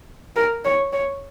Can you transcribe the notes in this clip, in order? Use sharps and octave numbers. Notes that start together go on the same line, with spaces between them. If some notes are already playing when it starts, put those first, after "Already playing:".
A#4
C#5
C#5